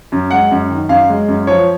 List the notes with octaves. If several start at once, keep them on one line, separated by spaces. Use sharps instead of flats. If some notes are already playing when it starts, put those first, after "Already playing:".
F#2
G#3 F#5
F#2
D#3
F#2 F5
G#3
F#2
F3 C#5